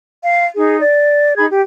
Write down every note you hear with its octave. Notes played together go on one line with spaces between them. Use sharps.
F5
D#4 G#4
D5
D#4 G#4 B5 G#6
G4